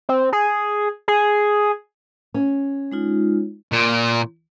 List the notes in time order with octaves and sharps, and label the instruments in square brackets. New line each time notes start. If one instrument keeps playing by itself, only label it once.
[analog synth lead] C4
G#4
G#4
[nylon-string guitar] C#4
[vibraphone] G#3 D#4 F4
[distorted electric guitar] A#2